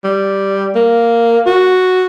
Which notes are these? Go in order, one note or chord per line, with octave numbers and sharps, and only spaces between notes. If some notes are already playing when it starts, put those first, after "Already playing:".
G3
A#3
F#4